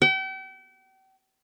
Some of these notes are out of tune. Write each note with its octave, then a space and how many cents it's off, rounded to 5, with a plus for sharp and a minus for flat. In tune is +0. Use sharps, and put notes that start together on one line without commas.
G5 -40